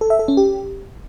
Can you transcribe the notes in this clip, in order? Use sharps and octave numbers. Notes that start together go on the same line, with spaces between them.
A4
E5
A4
C#4
G4